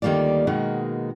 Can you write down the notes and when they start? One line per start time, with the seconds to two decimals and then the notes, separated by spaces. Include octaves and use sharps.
0.02 D2 D#3 G3 A#3 F4 D5
0.47 B2 D#3 G#3 A#3 D#4 F#4